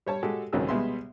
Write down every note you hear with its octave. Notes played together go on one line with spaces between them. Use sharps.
G3 C#5 A5
G#3 F#4 G4 A4
G#1 C#2 D#3 F#3 G#3 E6
B2 G3 G#3 B3 E5 C6